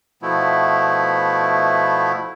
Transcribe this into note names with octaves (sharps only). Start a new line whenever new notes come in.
B2 F3 A3 B3 E4